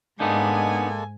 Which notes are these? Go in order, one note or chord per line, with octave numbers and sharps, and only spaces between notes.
G#2 G#3 A#3 B3 D4 D#4 A4 G#5